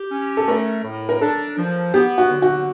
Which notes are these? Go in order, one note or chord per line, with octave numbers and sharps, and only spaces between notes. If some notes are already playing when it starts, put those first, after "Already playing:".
Already playing: G4
C#4
A4
A3 A#4
A2
A#4
D4 A4
F3
B3 G4
F#4
D3
F#4